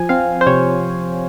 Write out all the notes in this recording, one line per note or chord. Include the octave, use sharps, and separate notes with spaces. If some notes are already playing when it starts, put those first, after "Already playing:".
Already playing: F3 G#5
C4 F5
C5
C3 C#5